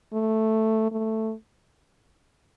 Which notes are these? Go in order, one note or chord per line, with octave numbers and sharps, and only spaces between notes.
A3
A3